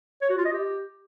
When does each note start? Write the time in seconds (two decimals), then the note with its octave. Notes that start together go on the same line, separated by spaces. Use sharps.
0.22 C#5
0.30 F#4
0.37 F4
0.45 D#5
0.53 G4